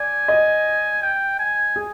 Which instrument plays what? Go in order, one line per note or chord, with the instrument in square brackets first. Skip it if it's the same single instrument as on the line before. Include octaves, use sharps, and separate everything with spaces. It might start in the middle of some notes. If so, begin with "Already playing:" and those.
Already playing: [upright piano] D5 [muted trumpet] G#5
[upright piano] D#5
[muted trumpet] G5
G#5
[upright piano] G#4